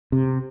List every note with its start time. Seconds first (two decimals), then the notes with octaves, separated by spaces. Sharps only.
0.12 C3